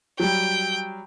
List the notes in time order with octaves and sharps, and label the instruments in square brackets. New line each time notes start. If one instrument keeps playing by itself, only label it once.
[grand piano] F#3 G3 [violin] G5